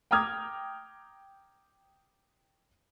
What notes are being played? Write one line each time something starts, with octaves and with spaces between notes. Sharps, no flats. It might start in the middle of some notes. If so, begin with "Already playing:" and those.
G5 A#5 D6 D#6 F6 G#6